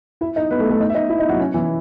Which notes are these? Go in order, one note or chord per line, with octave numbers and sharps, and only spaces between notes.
E4 E5
D#4 D#5
B3 B4
A3 A4
A3 A4
D#4 D#5
E5
D#4 D#5
E4 E5
D#4 D#5
F#3 F#4
C#4
E3 E4